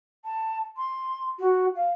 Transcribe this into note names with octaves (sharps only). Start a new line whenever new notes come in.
A5
C6
F#4
F5